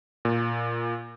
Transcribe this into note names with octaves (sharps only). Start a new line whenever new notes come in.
A#2